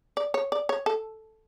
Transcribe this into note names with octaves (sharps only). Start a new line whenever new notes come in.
D5
C#5
D5
C#5
A4